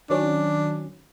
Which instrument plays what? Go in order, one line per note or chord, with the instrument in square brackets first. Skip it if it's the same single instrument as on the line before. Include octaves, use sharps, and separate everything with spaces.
[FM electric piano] D#3 F#3 C#4 [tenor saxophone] D4